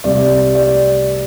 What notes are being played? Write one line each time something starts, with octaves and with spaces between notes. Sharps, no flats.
C2 C3 G3 D5
D5